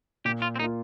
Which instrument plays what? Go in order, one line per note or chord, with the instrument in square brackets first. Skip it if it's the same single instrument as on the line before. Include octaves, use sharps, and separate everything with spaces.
[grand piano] A#2 [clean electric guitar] G4
[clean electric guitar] F4
C4
[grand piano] A#3 [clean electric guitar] D#4
[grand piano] F4